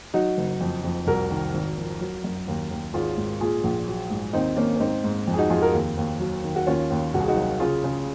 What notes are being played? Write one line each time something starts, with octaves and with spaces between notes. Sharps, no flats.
F#3 D#4 F#4
F#1
F2
F2
C2 F#4 A#4
D#3
G#1
F3
F#3
F#2
D#2
D#2
G#1 F4 G#4
G#2
A#2 F4 G#4
A#1
F#3
G#2
D#2 C4 D#4
D#2 A#3 C#4
C#4
G#2 C4 D#4
G#2
F2
G#4
D#4 F#4
F2 F4 G#4
F#4 A#4
D#2
D#2
F#3
D#3
F#4
D#2 C#4 F4
D#2
C2 F#4
G#4
D#4 F#4
F#3
C#3 F4 G#4
C#3